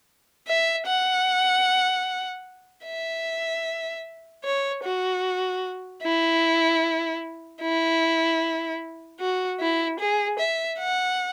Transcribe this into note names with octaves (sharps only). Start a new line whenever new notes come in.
E5
F#5
E5
C#5
F#4
E4
E4
F#4
E4
G#4
E5
F#5